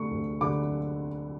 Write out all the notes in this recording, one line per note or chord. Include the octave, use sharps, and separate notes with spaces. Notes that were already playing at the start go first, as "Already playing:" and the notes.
Already playing: D3 A3 C#6
D2
D3 D6